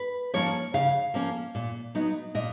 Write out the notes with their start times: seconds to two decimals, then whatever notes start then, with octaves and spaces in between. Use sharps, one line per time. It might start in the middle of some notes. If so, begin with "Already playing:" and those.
Already playing: B4
0.34 F3 A#3 C#4 C#5
0.74 C#3 F5
1.14 F3 A#3 C#4
1.55 A#2
1.95 F#3 B3 D#4
2.35 A#2 D#5